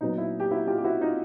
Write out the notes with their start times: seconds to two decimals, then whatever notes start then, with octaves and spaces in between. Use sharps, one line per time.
0.01 A#2 F#3 B3 D#4
0.18 E4
0.40 G4
0.51 E4 F#4
0.67 F4 G4
0.78 G4
0.84 E4 F#4
1.01 D#4 F4